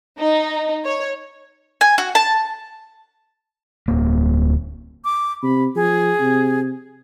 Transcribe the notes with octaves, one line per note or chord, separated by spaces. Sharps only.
D#4
C#5
G#5
F#4
A5
D1 A#3
D6
C3 B5
F3 G#4
C3